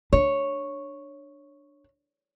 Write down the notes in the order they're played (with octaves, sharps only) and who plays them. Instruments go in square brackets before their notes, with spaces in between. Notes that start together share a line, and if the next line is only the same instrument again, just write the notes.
[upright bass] D4 [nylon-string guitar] C#5